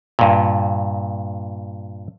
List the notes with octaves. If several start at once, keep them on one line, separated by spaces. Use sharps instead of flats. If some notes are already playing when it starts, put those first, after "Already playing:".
G2 A#2